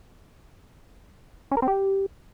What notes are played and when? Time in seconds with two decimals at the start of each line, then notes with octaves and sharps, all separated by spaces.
1.51 C#4
1.57 A#4
1.62 C4
1.68 G4